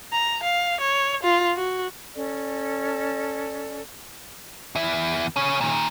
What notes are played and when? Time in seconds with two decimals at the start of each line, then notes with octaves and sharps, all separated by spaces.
0.13 A#5
0.43 F5
0.81 C#5
1.23 F4
1.57 F#4
2.16 C#4 A4 D5
4.76 E2 E4
5.37 C#3 C#5
5.61 A#2 D#3